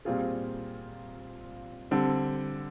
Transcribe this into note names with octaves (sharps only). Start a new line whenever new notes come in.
A#2 G3 C4 F4 G#4
D3 G3 C4